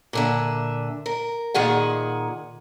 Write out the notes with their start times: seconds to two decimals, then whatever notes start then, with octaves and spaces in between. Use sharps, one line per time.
0.13 A#2 D3 E5
1.06 A#4
1.54 A#2 D#3 G#4 F#5